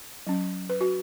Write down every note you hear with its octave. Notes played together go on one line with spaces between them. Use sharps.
F#3 C#4
B4
F#4